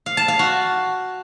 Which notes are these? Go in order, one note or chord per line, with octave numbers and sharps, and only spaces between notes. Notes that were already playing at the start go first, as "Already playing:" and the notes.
F5
A5
F5
F#4